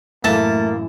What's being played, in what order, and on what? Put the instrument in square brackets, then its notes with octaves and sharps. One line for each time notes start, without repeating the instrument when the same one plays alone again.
[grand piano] F#2 A2 E3 [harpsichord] A3 [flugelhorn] A#3 [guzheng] A5